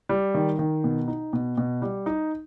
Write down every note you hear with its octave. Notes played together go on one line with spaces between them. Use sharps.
G3
D#3
D#3
B2
D#4
B2
B2
G3
D#4